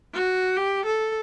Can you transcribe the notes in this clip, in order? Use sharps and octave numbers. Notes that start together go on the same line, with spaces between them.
F#4
G4
A4